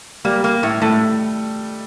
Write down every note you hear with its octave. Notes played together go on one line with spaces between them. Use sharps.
G3 A#3
A#3
A2
A2 A3